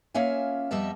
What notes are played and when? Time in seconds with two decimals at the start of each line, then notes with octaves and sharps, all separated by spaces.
0.14 A#3 C#4 F4 E5 G#5
0.71 F2 G3 B3 D#5 E5 A5